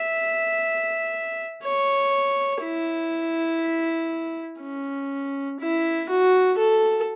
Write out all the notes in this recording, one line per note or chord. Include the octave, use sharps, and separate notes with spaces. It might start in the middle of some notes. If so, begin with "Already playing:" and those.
Already playing: E5
C#5
E4
C#4
E4
F#4
A4